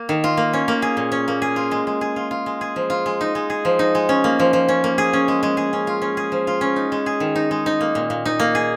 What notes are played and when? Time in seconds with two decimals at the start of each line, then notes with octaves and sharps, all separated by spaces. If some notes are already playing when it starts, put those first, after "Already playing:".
Already playing: A#3
0.09 D#3
0.24 F4
0.37 A#3
0.53 C#4
0.68 A#3
0.82 G#4
0.97 A#2
1.12 C#4
1.28 A#3
1.42 G#4
1.56 F4
1.71 G#3
1.87 G#3
2.01 G#4
2.16 F4
2.31 F4
2.46 G#3
2.61 G#4
2.76 F3
2.90 F4
3.06 G#3
3.21 D#4
3.35 G#3
3.50 G#4
3.65 F3
3.79 D#4
3.95 G#3
4.09 C#4
4.24 A#3
4.39 F3
4.53 F3
4.68 C#4
4.84 A#3
4.98 G#4
5.13 C#4
5.28 G#3
5.43 G#3
5.57 G#4
5.73 C#4
5.87 F4
6.02 C#4
6.17 G#4
6.32 F3
6.47 F4
6.61 C#4
6.76 D#4
6.92 G#3
7.06 G#4
7.20 D#3
7.35 D#4
7.51 G#3
7.66 D#4
7.81 A#3
7.95 A#2
8.10 A#2
8.25 D#4
8.40 A#3
8.55 G#4